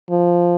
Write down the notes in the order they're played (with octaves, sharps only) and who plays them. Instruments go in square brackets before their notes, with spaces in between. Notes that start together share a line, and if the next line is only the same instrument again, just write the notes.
[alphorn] F3